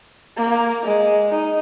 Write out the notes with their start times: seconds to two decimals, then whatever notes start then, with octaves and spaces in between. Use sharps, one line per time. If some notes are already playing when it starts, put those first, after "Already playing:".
0.38 A#3
0.84 G#3
1.30 D#4